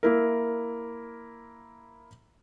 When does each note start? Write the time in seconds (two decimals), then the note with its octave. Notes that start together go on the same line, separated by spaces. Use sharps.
0.03 A#3 E4 A#4